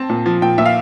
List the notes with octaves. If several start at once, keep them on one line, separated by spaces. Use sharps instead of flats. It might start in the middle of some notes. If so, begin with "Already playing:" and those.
Already playing: C4 A5
A#2
F3
A#2 G5
A#2 E5
F5